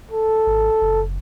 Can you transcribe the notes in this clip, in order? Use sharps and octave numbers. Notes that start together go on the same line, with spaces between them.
A4
G#1
F#1